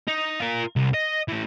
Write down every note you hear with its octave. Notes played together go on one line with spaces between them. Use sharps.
D#4
F4 A#4
C2
D#5
E3 A3